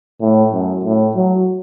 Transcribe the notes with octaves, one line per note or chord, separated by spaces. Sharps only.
A2
F#2
A2
F#3